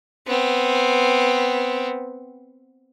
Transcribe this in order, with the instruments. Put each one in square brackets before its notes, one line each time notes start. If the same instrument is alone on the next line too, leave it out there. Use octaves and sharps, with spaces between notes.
[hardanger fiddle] B3 C4